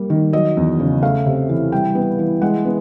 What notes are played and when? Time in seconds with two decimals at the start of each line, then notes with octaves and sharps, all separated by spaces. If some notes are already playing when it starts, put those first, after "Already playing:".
Already playing: G3 A#3
0.10 D#3
0.33 F#3 D#5
0.57 E2
0.79 C#3
1.03 A3 F5
1.26 C3
1.49 E3
1.72 G3 G5
1.95 B3
2.19 E3
2.42 G#3 F#5
2.65 B3